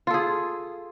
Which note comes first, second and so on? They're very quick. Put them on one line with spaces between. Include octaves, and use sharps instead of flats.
F4 A4 G#4